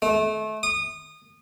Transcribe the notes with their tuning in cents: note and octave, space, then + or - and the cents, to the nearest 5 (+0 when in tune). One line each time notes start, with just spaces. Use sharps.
A3 -30
D#6 -25